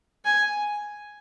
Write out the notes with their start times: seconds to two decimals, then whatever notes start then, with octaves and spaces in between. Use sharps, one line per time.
0.25 G#5